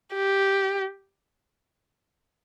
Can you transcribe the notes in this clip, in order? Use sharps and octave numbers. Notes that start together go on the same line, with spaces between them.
G4